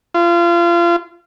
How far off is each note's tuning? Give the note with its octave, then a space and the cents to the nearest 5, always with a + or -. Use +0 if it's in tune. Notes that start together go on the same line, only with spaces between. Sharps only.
F4 -30